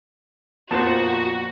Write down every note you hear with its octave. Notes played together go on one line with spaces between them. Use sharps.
F2 A#2 B3 C4 F#4 C5 A5